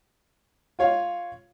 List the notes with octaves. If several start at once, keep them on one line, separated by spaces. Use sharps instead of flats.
F4 C#5 F5